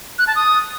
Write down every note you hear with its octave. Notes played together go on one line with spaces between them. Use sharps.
F#6
A5
D#6